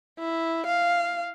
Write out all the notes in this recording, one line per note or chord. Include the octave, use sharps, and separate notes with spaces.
E4
F5